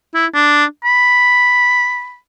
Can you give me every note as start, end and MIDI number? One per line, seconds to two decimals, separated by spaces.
0.14 0.26 64
0.34 0.65 62
0.84 2.17 83